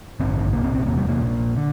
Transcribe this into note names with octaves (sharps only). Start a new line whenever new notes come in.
A1 G2 D3 C4
C2 A#2 A#3
C4
C4
E1 E2 C3 A#3
G3
A#3
A#1 A#2
D3